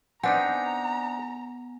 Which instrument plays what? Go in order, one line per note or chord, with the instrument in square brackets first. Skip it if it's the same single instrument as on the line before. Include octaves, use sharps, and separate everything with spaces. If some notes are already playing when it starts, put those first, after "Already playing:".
[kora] B3 [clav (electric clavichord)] C4 D4 D#4 [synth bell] G#5 [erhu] A#5